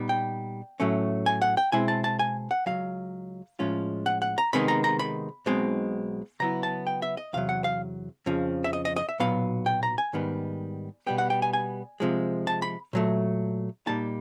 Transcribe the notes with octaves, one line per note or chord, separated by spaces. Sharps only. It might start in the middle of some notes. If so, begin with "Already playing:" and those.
Already playing: A#2 G3 B3 D#4
G5
A2 F#3 A3 C#4
G#5
F#5
G5
B2 G#3 C4 E4 G#5
A5
A5
G#5
F#5
C#2 B2 F#3 F5
A2 F3 G#3 C#4 F4
F#5
F#5
A#5
C3 D#3 G#3 B3 D#4 B5
A#5
A#5
B5
B1 B2 G#3 C4 D#4
C#3 F#3 B3 E4 A#5
A5
G5
E5
D#5
E2 C3 F#3 F5
F#5
F5
F2 C#3 F3
E5
D#5
D#5
D#5
E5
B1 A#2 F#3 B3 F5
G5
A#5
G#5
G#2 D#3 G3 B3
B2 G3 B3 G5
F#5
G5
G#5
G#5
C3 F3 G#3
A5
B5
A#2 F#3 A3
A#2 G3 A#3 D#4 A5